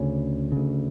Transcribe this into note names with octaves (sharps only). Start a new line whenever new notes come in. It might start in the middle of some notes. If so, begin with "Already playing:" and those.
Already playing: D2 C#3 C#4
D2 C#3